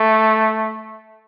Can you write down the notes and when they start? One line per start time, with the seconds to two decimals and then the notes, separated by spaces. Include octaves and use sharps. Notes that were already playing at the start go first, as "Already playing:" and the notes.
Already playing: A3